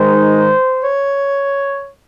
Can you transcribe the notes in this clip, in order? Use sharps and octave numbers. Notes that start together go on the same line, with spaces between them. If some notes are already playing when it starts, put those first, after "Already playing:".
Already playing: G#2 D#3 G#3 D#4 C5
C#5